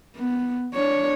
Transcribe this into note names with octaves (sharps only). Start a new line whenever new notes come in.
B3
D4 C#5